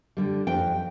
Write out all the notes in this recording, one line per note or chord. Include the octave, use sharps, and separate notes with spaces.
D3 G3
F2 G5